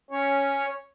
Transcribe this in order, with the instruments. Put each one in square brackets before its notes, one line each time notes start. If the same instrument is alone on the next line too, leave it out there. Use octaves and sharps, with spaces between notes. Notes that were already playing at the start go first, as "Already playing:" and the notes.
[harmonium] C#4 [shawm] C#5